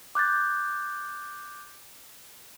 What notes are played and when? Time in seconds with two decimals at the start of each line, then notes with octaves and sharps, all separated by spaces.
0.15 D6 F#6 G6 A6